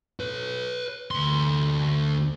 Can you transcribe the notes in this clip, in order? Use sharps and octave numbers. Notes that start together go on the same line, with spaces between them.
B4 C#5
D2 C6